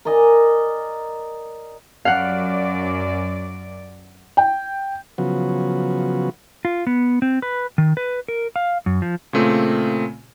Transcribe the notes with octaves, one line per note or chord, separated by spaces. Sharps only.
A#4 D5 D#5 G#5
F#2 D5 F5 F#5
G5
C#3 F3 F#3 B3 F#4
F4
B3
C4
B4
D#3
B4
A#4
F5
F#2
F3
A#2 C#3 A3 C4 F4